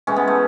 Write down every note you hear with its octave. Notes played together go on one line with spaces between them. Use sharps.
A2 E3 G#3 C#4
B3
A3